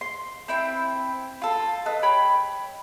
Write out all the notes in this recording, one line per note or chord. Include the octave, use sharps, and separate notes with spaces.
C6
C4 E4 G5
F4 A4
A4 B4 D#5
C#5 G5 B5